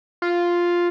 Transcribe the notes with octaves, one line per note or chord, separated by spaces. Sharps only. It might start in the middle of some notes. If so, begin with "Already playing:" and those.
F4